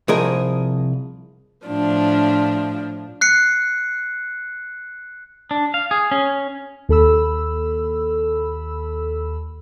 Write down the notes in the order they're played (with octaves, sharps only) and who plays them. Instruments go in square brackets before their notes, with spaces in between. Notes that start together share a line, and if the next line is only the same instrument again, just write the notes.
[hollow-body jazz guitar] C2 F3 G#4 A#4 D#5
[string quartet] A2 F3 D4
[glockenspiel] F#6 C7 C#7
[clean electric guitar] D4
F5
G#4
C#4
[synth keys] D#2 A4 B5 E6